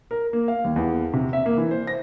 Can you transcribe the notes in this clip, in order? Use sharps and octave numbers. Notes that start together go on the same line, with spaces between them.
A#4
A#3
F5
D#2
E2
C3
E5
A#3
E3
C5
A#6